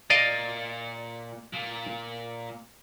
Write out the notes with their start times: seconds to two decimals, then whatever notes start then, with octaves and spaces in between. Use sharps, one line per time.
0.10 A#2 D5 D#5 F5
1.53 A#2